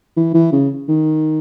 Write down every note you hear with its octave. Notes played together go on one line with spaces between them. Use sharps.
E3
E3
C#3
D#3